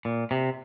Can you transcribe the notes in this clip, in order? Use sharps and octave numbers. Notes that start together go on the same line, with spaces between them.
A#2
C3